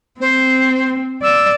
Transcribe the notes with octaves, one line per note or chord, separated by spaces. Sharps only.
C4 C5
D5 E6